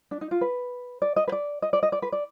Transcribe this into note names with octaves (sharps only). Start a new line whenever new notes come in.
D4
D#4
F4
B4
D5
D#5
B4
D5
D#5
D5
D#5
D5
B4
D5